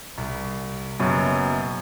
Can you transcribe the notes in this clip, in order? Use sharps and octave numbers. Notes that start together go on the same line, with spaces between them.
C2
F#1 F#2 B2 F#3